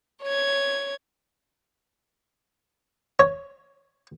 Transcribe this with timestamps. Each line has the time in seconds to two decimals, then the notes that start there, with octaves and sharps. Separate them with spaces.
0.23 C#5 G#6
3.19 C#5